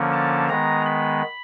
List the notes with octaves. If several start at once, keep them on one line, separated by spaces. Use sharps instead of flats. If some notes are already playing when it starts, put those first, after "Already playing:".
Already playing: D3 F3 A#3 C#4
A5
D#3 G#3 B3 A#5
B5